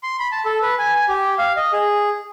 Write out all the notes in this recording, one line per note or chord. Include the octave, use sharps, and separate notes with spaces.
C6
B5
A5
A4
B4
G#5
G#5
G4
F5
D#5
G#4